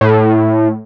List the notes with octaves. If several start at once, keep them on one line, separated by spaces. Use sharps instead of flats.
A2